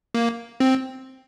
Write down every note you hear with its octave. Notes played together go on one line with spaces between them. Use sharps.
A#3
C4